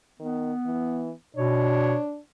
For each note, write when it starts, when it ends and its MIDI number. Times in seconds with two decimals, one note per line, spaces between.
0.20 0.52 51
0.20 1.13 59
0.66 1.11 52
1.37 1.95 47
1.37 2.19 62
1.37 2.01 73